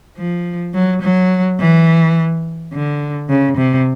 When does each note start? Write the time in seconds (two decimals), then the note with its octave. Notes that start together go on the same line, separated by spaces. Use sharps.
0.17 F3
0.74 F#3
1.02 F#3
1.59 E3
2.73 D3
3.29 C#3
3.57 C3